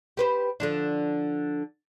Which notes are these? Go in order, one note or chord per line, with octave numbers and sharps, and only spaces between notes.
G4 B4 C5
D3 F3 D4